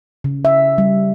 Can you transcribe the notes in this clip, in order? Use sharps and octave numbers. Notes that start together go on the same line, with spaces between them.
C#3
E5
G3